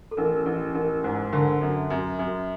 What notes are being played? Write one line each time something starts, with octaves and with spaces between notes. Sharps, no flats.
A4
A1 A#4
A1
A1 A#4
G#2
D3 A#4
F#2
F#2
F#2